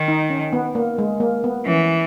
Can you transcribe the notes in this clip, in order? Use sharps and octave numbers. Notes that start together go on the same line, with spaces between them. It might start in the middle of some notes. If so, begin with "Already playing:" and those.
Already playing: D#3
D#4
C#4
B3
A#3
G#3
A#3
B3
E3 C#4